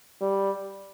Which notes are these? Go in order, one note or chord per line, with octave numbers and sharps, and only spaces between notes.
G3